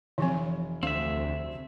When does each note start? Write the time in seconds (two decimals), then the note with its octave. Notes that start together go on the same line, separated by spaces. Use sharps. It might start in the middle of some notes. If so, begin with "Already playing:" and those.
0.18 F1 E3 F3 C4
0.83 D2 C4 E5 F5